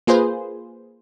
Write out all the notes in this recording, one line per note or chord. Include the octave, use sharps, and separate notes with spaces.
A#3 F4 G#4 B4 C5